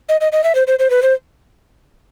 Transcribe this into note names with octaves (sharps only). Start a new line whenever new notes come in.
D#5
D#5
D#5
E5
C5
C5
C5
B4
C5